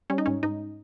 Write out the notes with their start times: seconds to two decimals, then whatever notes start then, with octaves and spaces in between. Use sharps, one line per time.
0.10 G3 C#4
0.18 D#4
0.26 G#2 C#4
0.43 G#2 D#4